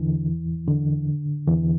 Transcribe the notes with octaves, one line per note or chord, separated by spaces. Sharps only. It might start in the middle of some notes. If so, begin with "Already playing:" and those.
Already playing: E2 D3 E3
D3
E2 E3